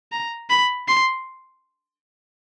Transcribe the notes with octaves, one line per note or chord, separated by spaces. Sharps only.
A#5
B5
C6